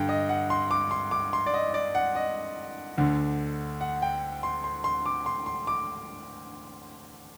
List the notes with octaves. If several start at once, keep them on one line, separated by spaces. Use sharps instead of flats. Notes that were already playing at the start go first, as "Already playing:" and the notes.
Already playing: G2 D3 G5
D#5
F#5
C6
D6
C6
D6
C6
D5
D#5
D5
F#5
D#5
D2 D3
F#5
G5
C6
C6
C6
D6
C6
C6
D6